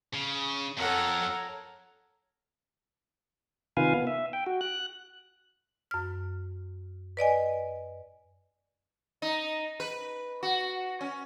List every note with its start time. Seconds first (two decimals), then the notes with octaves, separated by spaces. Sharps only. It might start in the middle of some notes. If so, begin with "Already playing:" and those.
0.14 C#3
0.78 F2 A4 A#4 C#5 F#5 A#5
3.77 C3 D#3 F4 B4 F5 G#5
3.94 B3
4.07 E5
4.33 G5
4.46 F#4
4.61 F#6
5.91 F#2 F6
7.17 B4 D5 D#5 G#5
9.22 D#4
9.80 B4
10.43 F#4
11.01 C#4